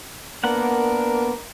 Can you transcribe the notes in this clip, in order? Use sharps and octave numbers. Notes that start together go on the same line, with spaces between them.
A#3 B3 D4 A#4 F#5